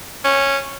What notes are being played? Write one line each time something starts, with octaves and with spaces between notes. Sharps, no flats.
C#4